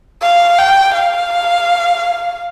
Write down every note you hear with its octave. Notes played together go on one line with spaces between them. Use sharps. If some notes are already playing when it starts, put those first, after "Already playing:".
F5
G5
F5